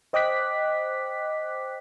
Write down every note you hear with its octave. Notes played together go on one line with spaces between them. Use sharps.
C5 D#5 G5 D6 F#6 B6